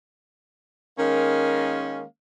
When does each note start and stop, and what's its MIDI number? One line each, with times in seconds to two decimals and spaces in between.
0.98 2.03 51
0.98 2.03 56
0.98 2.03 58
0.98 2.03 61